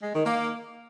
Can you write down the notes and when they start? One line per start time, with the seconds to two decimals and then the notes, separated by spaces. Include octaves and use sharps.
0.03 G#3
0.14 D#3
0.25 A#3